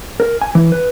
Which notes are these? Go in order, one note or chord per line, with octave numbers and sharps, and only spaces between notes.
A#4
G#5
E3
B4